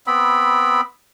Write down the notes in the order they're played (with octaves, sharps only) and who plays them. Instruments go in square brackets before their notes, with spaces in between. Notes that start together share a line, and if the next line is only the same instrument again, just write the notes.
[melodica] B3 C4 B5